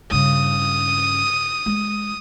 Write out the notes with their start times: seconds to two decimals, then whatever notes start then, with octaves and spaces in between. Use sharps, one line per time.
0.11 G2 C#3 D#6
1.66 G#3